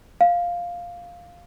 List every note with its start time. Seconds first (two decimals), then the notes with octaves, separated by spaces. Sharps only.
0.21 F5